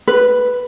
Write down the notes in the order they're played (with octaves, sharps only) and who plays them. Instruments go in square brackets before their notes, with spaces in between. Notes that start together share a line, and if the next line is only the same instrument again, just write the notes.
[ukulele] B4